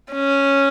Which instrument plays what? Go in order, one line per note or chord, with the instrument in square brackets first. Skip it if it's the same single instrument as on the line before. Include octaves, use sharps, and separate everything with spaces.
[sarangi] C#4